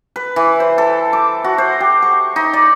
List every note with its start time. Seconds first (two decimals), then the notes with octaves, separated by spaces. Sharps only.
0.16 B4
0.36 E3
0.60 C5
0.78 A4
1.13 D6
1.44 F#4
1.58 C5
1.80 G4
2.02 C#6
2.36 D#4
2.53 D5